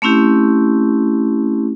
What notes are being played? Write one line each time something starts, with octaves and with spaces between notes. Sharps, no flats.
A3 C4 C#4 E4 G4